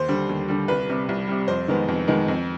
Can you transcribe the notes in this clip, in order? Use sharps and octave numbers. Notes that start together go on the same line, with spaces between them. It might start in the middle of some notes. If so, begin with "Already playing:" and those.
Already playing: D#2 C5
D3 G3
D#2
D3 G3
C2 B4
C3 G3
C2
C3 G3
F2 C5
D#3 G#3 B3
F2
D#3 G#3 B3
F2